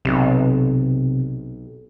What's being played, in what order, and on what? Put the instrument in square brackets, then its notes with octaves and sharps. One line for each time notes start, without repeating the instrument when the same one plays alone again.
[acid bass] B1 [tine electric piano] C3